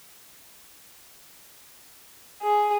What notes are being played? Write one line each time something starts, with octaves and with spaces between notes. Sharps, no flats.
G#4